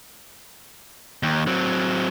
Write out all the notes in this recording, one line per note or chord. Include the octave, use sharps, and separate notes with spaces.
D#2
F#3 C4